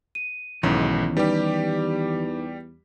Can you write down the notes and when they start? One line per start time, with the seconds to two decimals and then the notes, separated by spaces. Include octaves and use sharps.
0.15 D#7
0.63 B1 E2 G#2 D#3 E3 C#4
1.17 G3 D#4 G4 B4 D5